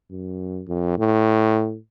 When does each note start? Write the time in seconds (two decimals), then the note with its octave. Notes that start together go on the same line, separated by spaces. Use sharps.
0.10 F#2
0.68 F2
0.98 A2